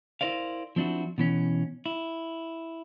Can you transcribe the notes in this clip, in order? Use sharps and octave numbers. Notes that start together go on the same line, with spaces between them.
E4 A#4 C5 D5 F5
F3 C4 D4 E4 F#4
B2 E3 C#4
E4